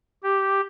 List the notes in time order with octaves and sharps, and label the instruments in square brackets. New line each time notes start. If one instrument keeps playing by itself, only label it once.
[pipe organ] G4